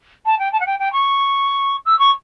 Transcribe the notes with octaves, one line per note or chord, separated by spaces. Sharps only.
A5
G5
A5
F#5
G5
G5
C#6
E6
C#6